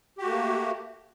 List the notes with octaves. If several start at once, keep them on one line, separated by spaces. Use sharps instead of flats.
A3 A#3 F#4 G4